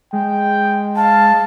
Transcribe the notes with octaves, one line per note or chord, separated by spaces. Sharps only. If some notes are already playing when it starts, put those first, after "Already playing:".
G#3 G5
F5 A5